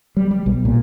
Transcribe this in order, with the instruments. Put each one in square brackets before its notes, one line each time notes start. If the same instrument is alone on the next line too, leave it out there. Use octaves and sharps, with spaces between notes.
[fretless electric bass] G3
G3
B1
A#2